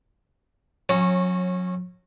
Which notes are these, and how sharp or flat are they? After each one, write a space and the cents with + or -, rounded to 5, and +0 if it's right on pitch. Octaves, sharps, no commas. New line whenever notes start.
F#3 -35 C#4 -20 F#4 +0